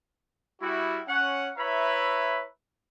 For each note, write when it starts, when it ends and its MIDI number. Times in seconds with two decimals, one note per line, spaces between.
0.61 1.00 55
0.61 1.00 64
0.61 1.00 66
1.08 1.49 61
1.08 1.49 78
1.57 2.44 64
1.57 2.44 71
1.57 2.44 73
1.57 2.44 76
1.57 2.44 82
1.57 2.44 83